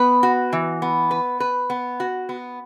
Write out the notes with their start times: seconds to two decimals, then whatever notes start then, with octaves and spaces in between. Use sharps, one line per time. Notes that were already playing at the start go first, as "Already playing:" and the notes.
Already playing: B3 B4
0.23 F#4
0.53 E3
0.82 B3
1.11 B4
1.40 B4
1.70 B3
2.00 F#4
2.29 B3